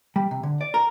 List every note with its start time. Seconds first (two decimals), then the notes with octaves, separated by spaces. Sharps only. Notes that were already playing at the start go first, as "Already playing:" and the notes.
0.16 G3
0.31 C3
0.43 D3
0.61 D5
0.74 A#4